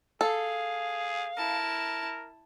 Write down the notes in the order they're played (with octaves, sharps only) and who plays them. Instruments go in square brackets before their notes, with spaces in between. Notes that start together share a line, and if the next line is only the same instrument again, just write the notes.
[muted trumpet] G#4 [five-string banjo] A4 [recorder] F5
[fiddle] E4 A5 [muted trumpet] A#4